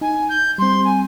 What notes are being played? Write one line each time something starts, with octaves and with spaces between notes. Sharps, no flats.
D#4 G#5
G6
G3 C4 C6
G#5